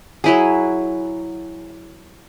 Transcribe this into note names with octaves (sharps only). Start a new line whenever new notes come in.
F#3 E4 G#4